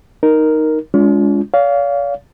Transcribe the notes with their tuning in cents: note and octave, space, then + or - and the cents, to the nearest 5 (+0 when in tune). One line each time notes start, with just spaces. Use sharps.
D#4 +0 A#4 +0
G#3 +0 C#4 +45 F4 +0
C#5 +45 F5 +0